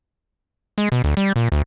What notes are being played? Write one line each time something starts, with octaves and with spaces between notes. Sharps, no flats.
G#3
B2
D2
G3
A#2
D2